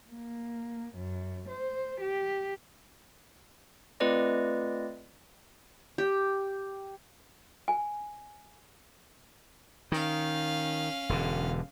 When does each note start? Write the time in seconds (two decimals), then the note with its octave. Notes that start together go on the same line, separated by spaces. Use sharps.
0.10 A#3
0.96 F#2
1.48 C5
2.00 G4
4.00 A3 C4 F4 B4 D5 D#5
5.98 G4
7.68 G#5
9.92 D#3 C#4 F5
11.09 E1 D3